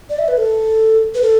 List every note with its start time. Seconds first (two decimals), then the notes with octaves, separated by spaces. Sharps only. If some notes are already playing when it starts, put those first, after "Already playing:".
0.09 D5
0.19 E5
0.28 B4
0.37 A4
1.14 B4
1.22 A4